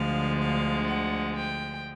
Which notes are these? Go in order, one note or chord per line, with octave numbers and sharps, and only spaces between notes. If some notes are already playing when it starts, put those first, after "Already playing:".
Already playing: D2 D3 F3 G#3 F5
F5
F#5
G5